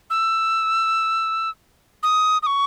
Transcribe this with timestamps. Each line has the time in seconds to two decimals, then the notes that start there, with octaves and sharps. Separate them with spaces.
0.10 E6
2.03 D#6
2.43 D#6
2.46 C#6